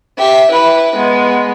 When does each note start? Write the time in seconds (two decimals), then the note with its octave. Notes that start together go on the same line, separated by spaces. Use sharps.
0.18 G4 E5
0.51 E4 B4
0.95 G#3 B3